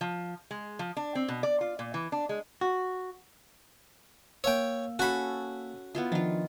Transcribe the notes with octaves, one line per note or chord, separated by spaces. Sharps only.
F3
G#3
F3
D4
C4
B2
D5
F4
A#2
E3
D4
G#3
F#4
A#3 C#5 F5 G5 E6
C#4 F#4 A4 B5
B3 E4 F4
D#3 F3 D4 F4